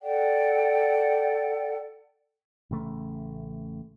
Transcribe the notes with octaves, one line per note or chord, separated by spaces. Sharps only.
A4 D5 F#5 G5
A1 C#3 A3